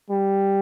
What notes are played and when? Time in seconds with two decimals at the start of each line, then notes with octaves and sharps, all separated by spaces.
0.10 G3